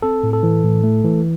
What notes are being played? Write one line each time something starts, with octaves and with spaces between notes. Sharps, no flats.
C4 A4
A2
A4
E3
A2
A3
E3